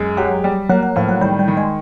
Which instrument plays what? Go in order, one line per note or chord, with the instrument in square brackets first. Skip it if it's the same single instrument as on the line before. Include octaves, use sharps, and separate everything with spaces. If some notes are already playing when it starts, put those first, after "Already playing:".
Already playing: [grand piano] F#2 G#3
[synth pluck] F#3 [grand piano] G4
[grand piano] G3
[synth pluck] F#3 [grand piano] A#3
[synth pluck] F#3
[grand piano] A2 [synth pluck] F3
[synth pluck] F#3
[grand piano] D#3 [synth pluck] G3
[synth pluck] G3
[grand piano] D#3
[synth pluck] G#3